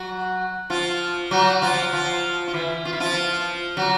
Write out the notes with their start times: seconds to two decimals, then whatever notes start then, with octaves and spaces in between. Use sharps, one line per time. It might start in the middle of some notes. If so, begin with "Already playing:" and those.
Already playing: F#3 F#4
0.70 F3 F4
1.31 F#3 F#4
1.62 F3 F4
1.93 F3 F4
2.48 F4
2.53 E3 E4
2.85 F4
2.93 E4
3.00 F3 F4
3.77 F#3 F#4